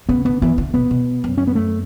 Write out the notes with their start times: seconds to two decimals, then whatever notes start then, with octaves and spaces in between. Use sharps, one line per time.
0.09 C#3 B3
0.25 D3 B3
0.42 E3 B3
0.58 D3
0.74 B2 B3
0.91 B2
1.24 F#2
1.38 C#4
1.47 B3
1.55 A3